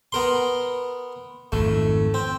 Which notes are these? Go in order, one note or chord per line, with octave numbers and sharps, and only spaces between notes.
B3 A#4 C6
G#1 F2 A3
C4